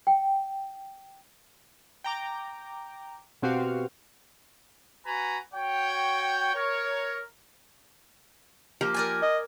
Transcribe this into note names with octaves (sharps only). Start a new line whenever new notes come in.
G5
G5 A#5 D6
B2 C4 F#4 G4 F5
F#4 B4 G#5 A#5 B5
F#4 C#5 G5
A#4 C#5
F3 A#3 G4
A#4 D5 G#5
D#5